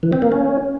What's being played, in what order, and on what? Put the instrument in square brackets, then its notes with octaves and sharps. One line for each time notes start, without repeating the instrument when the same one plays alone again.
[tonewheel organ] E3
C4
A#3
C#4